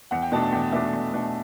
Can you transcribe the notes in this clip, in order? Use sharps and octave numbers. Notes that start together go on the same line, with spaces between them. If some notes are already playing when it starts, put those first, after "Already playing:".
E2 F#5
G5
B2 A3 D4 A5
A5
E2 G5
B2 A3 D4 E5
E2
B2 A3 D4